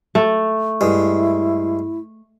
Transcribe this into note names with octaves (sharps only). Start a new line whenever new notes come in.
A3
G2 G#3 E4